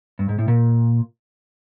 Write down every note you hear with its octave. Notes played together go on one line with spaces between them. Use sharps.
G2
G#2
A2
A#2